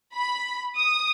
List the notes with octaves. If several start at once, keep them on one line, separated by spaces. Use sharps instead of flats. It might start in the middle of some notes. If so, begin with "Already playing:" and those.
B5
D#6